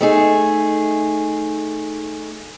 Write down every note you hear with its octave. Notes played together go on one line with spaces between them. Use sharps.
A3 D#4 G#4